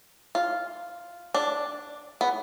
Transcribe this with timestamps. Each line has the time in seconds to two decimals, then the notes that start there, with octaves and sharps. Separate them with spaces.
0.35 F4
1.34 D4
2.21 B3